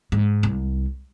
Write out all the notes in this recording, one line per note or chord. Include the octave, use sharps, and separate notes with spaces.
G#2
C2